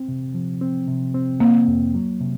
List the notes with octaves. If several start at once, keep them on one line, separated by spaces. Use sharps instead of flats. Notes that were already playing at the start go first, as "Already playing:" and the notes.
Already playing: C4
C3
F3
C4
C3
C4
A#3 C4
F2
F#3
C3